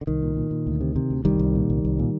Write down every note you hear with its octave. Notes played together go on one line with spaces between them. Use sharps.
D3
C2 D#3
A#2
A#2
A#2
D2
C3
C3
D2
C2 D#3 G3
C2
A#2
C2
C2
A#2